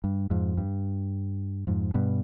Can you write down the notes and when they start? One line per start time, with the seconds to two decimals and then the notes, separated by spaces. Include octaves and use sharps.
0.04 G2
0.30 F2 G#2
0.58 G2
1.67 F2 G#2
1.94 G2 B2